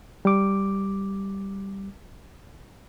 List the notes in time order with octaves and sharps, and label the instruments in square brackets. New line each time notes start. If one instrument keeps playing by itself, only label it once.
[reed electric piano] G3 D6